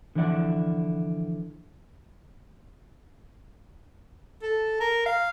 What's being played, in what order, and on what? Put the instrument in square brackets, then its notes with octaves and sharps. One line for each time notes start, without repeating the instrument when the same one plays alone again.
[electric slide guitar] D3 E3 F3 E4 D5 F#5
[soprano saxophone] A4
A#4
F5